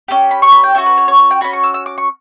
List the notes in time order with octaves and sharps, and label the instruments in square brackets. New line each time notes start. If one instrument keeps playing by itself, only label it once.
[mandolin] C#4 E4 G4
B5
C#6
B5
G5
C#4 F#4 E5
B4
C#5
C#5
C#5
G5
C#4 F#4 B5
C#6
E6
E6
D6
C#6